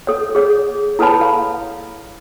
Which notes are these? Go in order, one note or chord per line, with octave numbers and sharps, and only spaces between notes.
A4 C#5
G#4 C#5
E4 A4 B4 C#5 A5 B5
F5